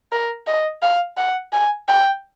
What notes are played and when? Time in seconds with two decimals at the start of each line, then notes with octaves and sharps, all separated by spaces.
0.12 A#4
0.47 D#5
0.82 F5
1.17 F#5
1.53 G#5
1.88 G5